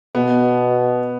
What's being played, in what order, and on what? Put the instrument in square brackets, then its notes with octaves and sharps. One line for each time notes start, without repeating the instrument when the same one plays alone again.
[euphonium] B2 [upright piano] B3